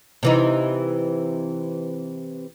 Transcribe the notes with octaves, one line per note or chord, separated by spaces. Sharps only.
C3 E3 D#4